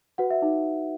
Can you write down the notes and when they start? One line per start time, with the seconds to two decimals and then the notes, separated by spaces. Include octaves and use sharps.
0.18 F#4 B4 F#5
0.30 E5
0.42 D#4